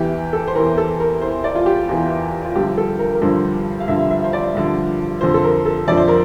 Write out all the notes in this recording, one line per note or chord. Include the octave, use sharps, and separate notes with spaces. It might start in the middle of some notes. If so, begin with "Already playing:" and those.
Already playing: E2 E3 G4
A4
C5
E2 E3 A#4
A4
A#4
E2 E3 C5
D5
F4
G4
E2 E3 F4
F4
G2 D3 F3 G4
A4
A#4
A#4
G2 D3 F3 C5
F5
G2 D3 F3 E5
E5
C5
D5
G2 D3 F3
F2 D3 F3 C5
A4
A#4
A4
F2 D3 F3 D5
C5
A#4